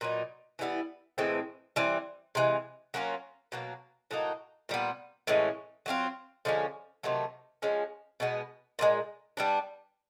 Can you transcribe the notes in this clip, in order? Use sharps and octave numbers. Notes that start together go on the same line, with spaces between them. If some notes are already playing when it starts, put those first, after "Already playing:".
A#2 F#3 B3 D#4
E3 G3 B3 E4
A2 E3 G#3 C4
E3 G3 C4
C3 E3 G#3
F#3 A#3 C#4 F4
B2 F#3 A#3
A2 F#3 A#3 D#4
A#2 G3 B3
A2 E3 G#3 C#4
F#3 A3 C4 F4
D3 F3 G#3 C#4
C3 D#3 F#3 A3
F3 G#3 C#4
B2 G#3 B3
A#2 F3 G#3
G3 B3 D4